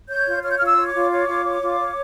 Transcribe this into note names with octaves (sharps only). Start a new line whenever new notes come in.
C#5 G6
F4
C#5 F6
G6
F4 F6
E6
C#5
D6
F4
C#5
F4
C#5
F4
C#5